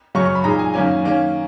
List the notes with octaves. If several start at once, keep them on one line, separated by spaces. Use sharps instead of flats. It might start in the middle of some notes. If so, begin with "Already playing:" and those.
F#2 C#3 F#3 C#6
C#6
B5
A#2 G#3 D#4 A#5
G#5
F#2 D#3 A#3 C#4 G#5
D#3 A#3 C#4